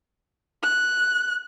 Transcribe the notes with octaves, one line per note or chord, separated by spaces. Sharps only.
F#6